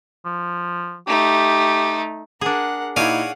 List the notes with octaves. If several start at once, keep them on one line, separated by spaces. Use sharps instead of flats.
F3
A3 D#4 G4
D4 G#4 A#4 F#5
A#2 D#4 E4 C#5 D5 F5 F#5 G#5